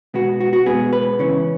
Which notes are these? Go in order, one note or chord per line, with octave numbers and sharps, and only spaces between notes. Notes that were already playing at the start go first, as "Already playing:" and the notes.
B2 G#3 B3 F#4
F#4
F#4
B2 G#3 B3 G#4
B4
C#3 E3 C#4